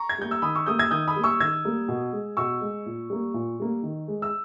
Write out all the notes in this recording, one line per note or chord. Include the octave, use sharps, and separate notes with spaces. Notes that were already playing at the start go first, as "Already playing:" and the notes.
Already playing: A#5 C#6
G#6
G3 A#3 G6
E6
D#3 B5 D#6
C#6 E6
G3 A#3 D#6 G6
E6 G#6
D#3 D#6 G6
B5 D#6
G3 A#3
C#6 E6
D#3 E6 G#6
G3 A#3
B2
G#3
B2 C#6 E6
G#3
A#2
G3 A#3
A#2
G3 A#3
D#3
G#3
E6